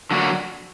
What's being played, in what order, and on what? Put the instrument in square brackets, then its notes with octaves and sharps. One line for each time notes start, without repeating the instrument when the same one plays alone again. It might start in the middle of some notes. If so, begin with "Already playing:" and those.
[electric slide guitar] D3 F#3 A#3 D4 F#4